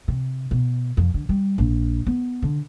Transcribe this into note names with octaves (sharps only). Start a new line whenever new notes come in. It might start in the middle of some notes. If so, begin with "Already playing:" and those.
C3
B2
F2
D3
G3
A#1
B3
D3